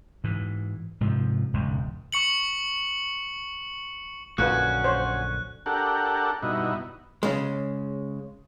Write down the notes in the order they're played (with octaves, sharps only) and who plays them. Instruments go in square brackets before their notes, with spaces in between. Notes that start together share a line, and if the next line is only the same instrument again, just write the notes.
[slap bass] G#2 E3
G#2 C3 F3
E1 C#2 G#2
[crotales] C#6 C#7 F#7
[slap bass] A#1 F#2 D3 [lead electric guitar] C#4 F#4 [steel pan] F4 B4 [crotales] F#6
[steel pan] C5 C#5
[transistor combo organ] D4 G4 A4 A#4 F#5
G2 B2 D#4 E4 F#4
[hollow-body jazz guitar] C#3 G#3